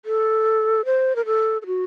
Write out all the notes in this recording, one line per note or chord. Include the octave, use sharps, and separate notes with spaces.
A4
C5
A#4
A4
A4
F#4